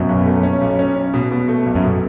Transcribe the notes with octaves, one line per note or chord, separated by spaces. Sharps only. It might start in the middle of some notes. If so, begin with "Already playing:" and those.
Already playing: F#2 B2
B1
A3
C#4
B1
C#4
C#4
B2
B2
A3
B1
F#2
B2